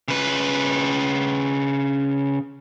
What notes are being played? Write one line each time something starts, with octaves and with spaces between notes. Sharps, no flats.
C#3 B4